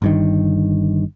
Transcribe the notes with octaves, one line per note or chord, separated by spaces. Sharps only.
G1 G2 D#3